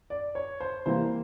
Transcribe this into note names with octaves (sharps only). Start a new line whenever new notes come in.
D5
C#5
C5
C3 E3 G3 A#3 C5